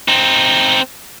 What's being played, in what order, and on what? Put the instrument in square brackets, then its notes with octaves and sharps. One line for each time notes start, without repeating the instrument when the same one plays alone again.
[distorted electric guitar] C4 D#4